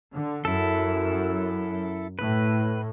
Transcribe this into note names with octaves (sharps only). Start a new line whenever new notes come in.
D3
F#2 E4 A4
A2 B4